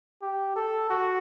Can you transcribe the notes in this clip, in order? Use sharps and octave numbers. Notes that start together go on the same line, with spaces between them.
G4
A4
F#4